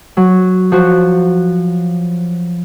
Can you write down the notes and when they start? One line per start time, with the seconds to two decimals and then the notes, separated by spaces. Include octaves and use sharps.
0.17 F#3
0.72 F3 F#4